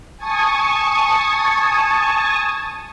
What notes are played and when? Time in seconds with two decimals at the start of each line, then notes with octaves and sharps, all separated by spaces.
0.17 G#5 A5 C#6 D#6